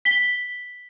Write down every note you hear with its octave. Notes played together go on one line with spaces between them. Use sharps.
B6 G7